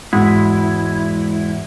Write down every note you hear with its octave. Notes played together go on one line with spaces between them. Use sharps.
E2 G#2 G#3 E4 F#4